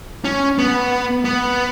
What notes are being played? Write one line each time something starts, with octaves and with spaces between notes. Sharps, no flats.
C#4
B3
B3